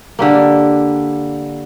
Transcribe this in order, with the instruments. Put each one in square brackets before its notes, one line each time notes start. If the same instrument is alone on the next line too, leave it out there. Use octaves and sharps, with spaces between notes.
[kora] D3 G3 A#3